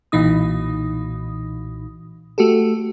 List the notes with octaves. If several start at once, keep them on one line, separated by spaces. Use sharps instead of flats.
B1 A#2 E3 D#4 D#6
A3 F#4 G4 A4